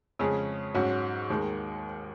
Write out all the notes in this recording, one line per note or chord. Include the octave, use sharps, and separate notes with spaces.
F2 C#3 G#3 C#4 G#4
G#2 F#3 C#4 F#4
D#2 D#3 G#3